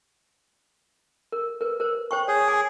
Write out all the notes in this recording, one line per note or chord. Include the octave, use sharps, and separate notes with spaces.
A#4
A#4 B4
A#4 C5
C5 G5 C#6
G#4 C#5
G#5 D6